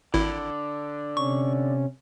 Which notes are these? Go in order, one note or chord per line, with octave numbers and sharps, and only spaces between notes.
G#1 D3 E4
C3 C#4 C#6